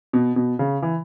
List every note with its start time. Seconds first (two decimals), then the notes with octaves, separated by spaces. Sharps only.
0.13 B2
0.36 B2
0.59 C#3
0.82 E3